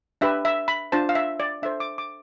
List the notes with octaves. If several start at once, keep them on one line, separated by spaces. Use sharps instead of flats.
D4 G4 B4 E5
E5
B5
D4 F4 C5 A5
F5
E5
D5
D4 A4 C5 E5
D6
D6